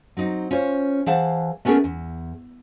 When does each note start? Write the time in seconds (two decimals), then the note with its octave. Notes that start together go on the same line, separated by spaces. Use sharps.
0.17 F#3 C4 D#4
0.51 C#4 F4 C5 C#5
1.06 E3 G#4 C5 F5 F#5 A5
1.65 A3 B3 C#4 F#4 G#4 A#4
1.84 E2